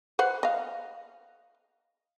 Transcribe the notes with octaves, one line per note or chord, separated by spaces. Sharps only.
B4 C5 F#5
D#5 F5